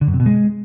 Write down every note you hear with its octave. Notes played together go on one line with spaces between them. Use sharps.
D3
F#2
C3
B2
G#3